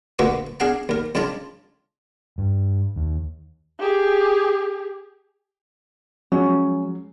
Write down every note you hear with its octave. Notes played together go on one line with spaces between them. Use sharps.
D2 A#2 D3 A#3 F#4 B4
D4 G#4 F5 F#5 A#5
D#2 A#4
F2 C#3 D4 F4 A5 A#5
G2
D#2
G4 G#4
F3 F#3 G#3 C#4